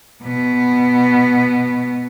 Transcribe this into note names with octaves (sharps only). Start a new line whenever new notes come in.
B2 B3